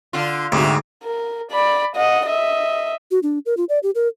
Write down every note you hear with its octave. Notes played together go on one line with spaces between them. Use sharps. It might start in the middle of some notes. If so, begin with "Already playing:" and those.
D3 F4
D2 G#2 C3 F#4
A#4
D5 B5
D#5 F#5
D#5 E5
F#4
D4
A#4
F4
D5
G4
A#4